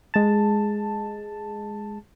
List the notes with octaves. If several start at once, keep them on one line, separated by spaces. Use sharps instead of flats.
G#3 A5